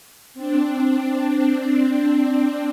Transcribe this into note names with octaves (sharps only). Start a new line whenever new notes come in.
C4 D4